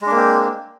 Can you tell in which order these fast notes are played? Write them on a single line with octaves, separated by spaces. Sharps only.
G#3 D4 A#3 C4